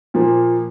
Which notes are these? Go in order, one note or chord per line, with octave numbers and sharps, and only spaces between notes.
A#2 F3 A#3